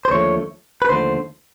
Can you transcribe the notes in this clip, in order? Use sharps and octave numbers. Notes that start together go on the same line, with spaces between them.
C5
D#2 D3 F3 A3 C#5
B4
D#2 D3 F3 A3 C5